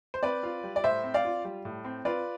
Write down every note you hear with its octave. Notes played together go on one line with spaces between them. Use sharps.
C5
C4 B4 D5
F4
G3
D5
A2 C5 E5
C4
D5 F5
F4
G3
A2
C4
F4 B4 D5